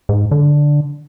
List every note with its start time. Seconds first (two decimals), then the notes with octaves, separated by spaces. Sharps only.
0.09 G#2
0.31 D3